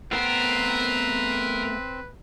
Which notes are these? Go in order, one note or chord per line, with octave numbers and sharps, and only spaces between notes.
A3 B3 C4 A#4 B4 F#5